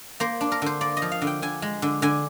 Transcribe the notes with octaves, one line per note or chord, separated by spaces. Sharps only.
A#3 C5
D4
A#4
D3 C5
A#3 D5
D#5
F3
F5
D3
G5
D3 G#5
G#3
D3
D3 G#5